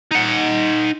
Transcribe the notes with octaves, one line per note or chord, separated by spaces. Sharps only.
D#4 F#5